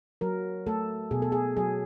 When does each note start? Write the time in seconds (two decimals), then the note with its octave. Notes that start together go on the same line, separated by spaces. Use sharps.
0.21 F#3 A#4
0.67 A3 A4
1.11 B2 G#4
1.22 A4
1.32 G#4
1.57 F#3 G#4